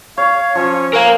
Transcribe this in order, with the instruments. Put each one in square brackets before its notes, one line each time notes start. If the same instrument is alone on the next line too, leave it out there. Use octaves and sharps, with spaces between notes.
[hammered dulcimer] C#5 [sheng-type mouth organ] F5
[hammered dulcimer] F3 [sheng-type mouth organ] C#4 C#5
[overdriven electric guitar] A#4 F5 [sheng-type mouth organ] G#5 E6 F#6